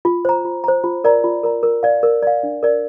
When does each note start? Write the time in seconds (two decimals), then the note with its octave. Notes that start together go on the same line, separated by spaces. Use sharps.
0.05 F4
0.25 C5 A#5
0.45 F4
0.64 C5 A#5
0.84 F4
1.04 A#4 D5 A#5
1.24 F4
1.43 A#4 D5 A#5
1.63 A#4
1.83 D5 F5
2.03 A#4
2.23 D5 F5
2.43 D4
2.63 A#4 D5